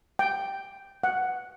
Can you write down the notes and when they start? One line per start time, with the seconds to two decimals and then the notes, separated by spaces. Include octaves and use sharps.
0.19 G5
1.04 F#5